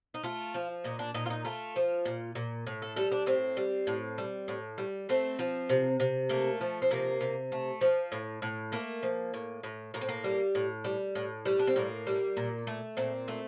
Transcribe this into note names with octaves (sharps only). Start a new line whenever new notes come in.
D#4
A3 F4
F3
A#2 D#4
D4
A#2 D#4
F4
D#4
A3 F4
F3
A#2
A#2
A2
A4
G3 A4
D4
A2 C4
G3
A2
G3
A2
G3
A3 C4
F3
C3
C3
A3 A#3
F3
C4
C3 A#3
C3
A3
F3
A2
A2
A3 A#3
F3
A2
A2
A2 A#3
C4
A#3
G3
A2
G3
A2
G3
D4
C4
A2 A#3
G3
A#2
A3
A#2 C4
A3